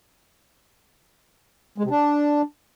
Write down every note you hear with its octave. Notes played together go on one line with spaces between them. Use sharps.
G#3
C3
D4